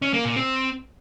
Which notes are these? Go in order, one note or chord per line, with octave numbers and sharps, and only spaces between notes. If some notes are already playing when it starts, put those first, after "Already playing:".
C#4
A#3
A#2
C4